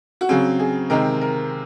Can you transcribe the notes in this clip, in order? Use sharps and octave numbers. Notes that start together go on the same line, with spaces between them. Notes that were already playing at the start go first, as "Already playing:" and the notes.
F#4
C#3 F#3 C4 G#4
G#4
C3 D#3 G#3 C4 A#4
A#4